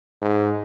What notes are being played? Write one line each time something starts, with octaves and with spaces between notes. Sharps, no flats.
G#2